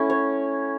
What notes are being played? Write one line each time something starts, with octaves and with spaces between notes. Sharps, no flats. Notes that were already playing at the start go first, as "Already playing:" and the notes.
Already playing: A3 C#4 E4 F#5
C#5